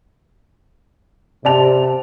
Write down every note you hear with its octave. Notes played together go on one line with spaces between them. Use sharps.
C3 D5 A5 F7